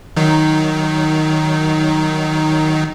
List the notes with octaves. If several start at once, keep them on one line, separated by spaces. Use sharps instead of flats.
D#3 F#3 D#4